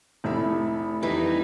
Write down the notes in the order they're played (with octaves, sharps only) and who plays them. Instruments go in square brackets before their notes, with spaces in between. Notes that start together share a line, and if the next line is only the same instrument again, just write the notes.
[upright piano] F1 E4 E5 [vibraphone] A3 B5
[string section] F2 G3 D#4 [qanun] E3 B4